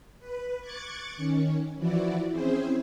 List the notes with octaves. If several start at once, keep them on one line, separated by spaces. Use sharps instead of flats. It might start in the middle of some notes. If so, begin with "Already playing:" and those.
B4
C#6 D6 F#6 G#6 A6 C#7
D#3 C#4
E3 F3 E4 F#4 D5
C4 C#4 E4 G#4 C5